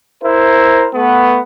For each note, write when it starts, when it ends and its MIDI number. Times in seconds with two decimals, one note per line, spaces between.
0.23 0.87 64
0.23 0.87 70
0.23 0.87 72
0.94 1.38 57
0.94 1.38 59